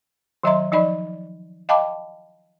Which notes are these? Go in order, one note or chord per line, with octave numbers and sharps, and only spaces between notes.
D#3 F#3 D#5 E5 A#5 C6
F3 D#4 D5 D#5 B5
D#5 F5 G5 A5 B5 D6